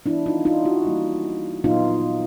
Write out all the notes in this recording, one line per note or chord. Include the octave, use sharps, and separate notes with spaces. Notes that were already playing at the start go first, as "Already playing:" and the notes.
E3 G3 B3 D4 E4
D#4 F4
D#4 F4
E4 F#4
E3 G3 A#3
A#2 F#3 B3 D#4 F4